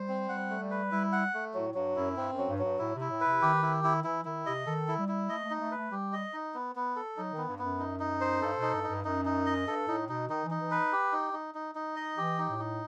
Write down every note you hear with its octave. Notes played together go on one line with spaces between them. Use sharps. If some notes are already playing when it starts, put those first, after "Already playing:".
Already playing: G3 C5
C4
G3 F#5
A3
G3
B4
G3 E4
F#5
A3
A2 F#3
G2 F#3
F#2 E4
G2 C4
F#2
F#3
G2
F#3
G2
A2 E4
C3
E4
A2
B4
C3
D#3 G4
E4
E4
E3 E4
D#3 E4
C3 D#5
D#3 A4
E4
G3
E4
A3 D#5
A3
D#4
A3
B4
A3
G3 G4
D#5
D#4
B3
B3
A4
F#3 D#4
D#3 B3
G2
F#2 B3
D#4
D#4
C5
G2 A4
B2
D#4
G2
D#4
G2
F#2 D#4
D#4
D#5
G2 A4
A2 D#4
B2 D#4
D#3 D#4
E3
D#4
E3
B4
G4
D#4
D#4
D#4
D#4
D#5
E3 G4
D#4
A2
D#4